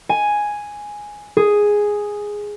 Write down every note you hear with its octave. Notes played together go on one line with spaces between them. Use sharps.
G#5
G#4